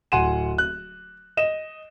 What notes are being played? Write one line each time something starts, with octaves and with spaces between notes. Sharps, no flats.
D1 F#5 G#5 C6 D#7 E7
F#6
D#5 E7